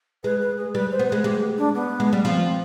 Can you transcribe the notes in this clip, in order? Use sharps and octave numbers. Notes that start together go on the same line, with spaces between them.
G#3 B4
B4
G#4
G3 B4
C5
B3
G#3 B4
G#3 G4
D4
B3
G#3
G3
F3 C4
C4